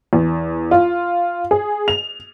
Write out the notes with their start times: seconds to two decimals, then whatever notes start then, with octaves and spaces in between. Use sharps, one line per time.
0.13 E2
0.71 F4
1.51 G#4
1.88 F7